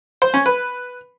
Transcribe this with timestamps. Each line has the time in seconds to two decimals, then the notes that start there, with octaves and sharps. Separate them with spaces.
0.22 C5
0.34 C#4
0.46 B4